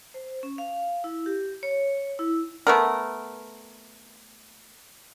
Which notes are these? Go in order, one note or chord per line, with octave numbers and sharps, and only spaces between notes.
C5
C#4
F5
E4
G4
C#5
E4
A3 B3 A#4